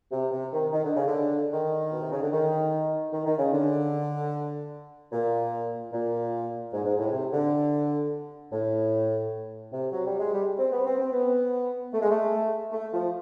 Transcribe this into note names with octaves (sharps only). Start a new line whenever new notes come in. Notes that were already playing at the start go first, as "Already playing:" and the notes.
C3
C3
D#3
D#3
D3
C#3
D3
D#3
B2
C3
C#3
D3
D#3
D#3
D#3
C#3
D3
A#2
A#2
G#2
G#2
A2
C3
D3
A2
C3
F#3
G3
G#3
G3
C4
B3
C4
C4
B3
A3
G#3
A3
A3
F3